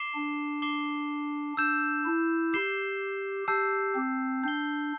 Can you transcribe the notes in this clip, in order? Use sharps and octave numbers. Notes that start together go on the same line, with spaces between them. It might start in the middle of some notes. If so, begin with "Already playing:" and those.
Already playing: D6 C7 E7 G7
D4
D6 C7 E7 G7
D4 E6 G6 E7
E4
G4 G6 C7 E7 G7
G4 A5 E6 G6 C7
C4
D4 G6 C7 G7